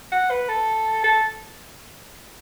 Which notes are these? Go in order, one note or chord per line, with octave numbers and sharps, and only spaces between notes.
F#5
B4
A4
A4